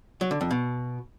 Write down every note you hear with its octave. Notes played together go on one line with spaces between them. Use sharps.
F#3
D3
F2
B2